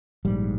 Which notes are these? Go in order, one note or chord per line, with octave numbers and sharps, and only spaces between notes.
A#1 G#2 G3